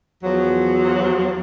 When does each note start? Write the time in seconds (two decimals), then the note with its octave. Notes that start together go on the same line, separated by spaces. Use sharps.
0.23 E2 F3 F#3